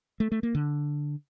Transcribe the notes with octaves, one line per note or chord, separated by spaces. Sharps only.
A3
A3
A#3
D3